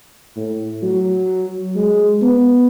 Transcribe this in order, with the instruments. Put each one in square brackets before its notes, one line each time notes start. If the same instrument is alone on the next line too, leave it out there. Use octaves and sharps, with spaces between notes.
[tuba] A2
F#3
G#3
B3